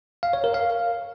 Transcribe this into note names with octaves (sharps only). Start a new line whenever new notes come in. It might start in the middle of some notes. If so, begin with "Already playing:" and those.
F5
C#5
A#4
F5